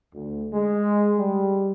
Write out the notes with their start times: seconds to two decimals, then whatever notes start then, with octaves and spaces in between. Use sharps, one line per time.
0.15 D2
0.54 G#3
1.18 G3